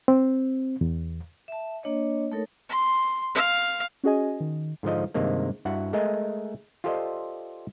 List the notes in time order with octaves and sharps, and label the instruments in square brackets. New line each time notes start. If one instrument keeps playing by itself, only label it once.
[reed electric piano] C4
E2
[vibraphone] E5 A5
A#3 D4 C#5 D#5
A3 D#4 A4 A#4 C#5
[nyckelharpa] C6
F5
[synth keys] C#4 F#4 G#4 D#5 G#5
D#3
[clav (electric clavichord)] G#2 D3 F3 D#5
G2 C3 D#3 G#3 A#3
G2 E4 F#4 F#5
G#3 A3 A#4 D#5 G#5
F4 G4 A4 C5 D5 D#5